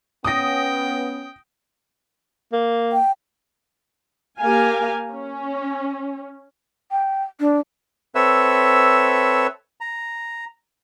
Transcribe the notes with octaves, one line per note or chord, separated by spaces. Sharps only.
B3 C#4 G5 D#6 A#6
A#3
G5
A#3 G4 A#4 F5 G#5
C#4
G5
D4
C4 A4 B4 C#5 E5 E6
A#5